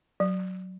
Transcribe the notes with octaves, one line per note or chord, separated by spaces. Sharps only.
F#3